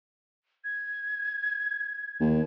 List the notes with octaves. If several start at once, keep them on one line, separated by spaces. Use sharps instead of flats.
G#6
D#2